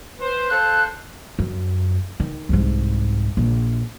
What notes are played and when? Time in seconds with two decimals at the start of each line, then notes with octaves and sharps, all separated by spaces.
0.19 B4 C5
0.49 A4 C5 F5 F#6
1.39 F#2
2.20 D#3
2.49 C2 G#2
3.37 A#1